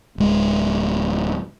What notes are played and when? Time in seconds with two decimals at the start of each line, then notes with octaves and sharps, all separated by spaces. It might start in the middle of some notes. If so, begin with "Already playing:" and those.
0.18 D1 G#3